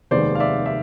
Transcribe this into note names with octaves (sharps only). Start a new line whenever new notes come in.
F1 D#2 D#3 G#3 B3 C5 D5
F5
D5 E5
E5